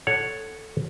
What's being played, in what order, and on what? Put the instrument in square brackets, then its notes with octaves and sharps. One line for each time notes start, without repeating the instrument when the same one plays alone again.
[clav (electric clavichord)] A4 C#5 F#5